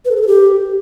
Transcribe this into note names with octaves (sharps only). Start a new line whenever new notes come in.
B4
A4
G#4
A4
G4